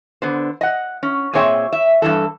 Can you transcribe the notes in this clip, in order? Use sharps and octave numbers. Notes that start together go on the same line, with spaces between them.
D3 B3 C5
D#5 F#5
C#4
A#2 C4 G#4 C#5 E5 G5
E5
G2 A#2 E3 A4